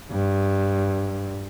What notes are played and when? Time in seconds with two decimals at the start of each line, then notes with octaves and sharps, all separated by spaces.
0.11 G2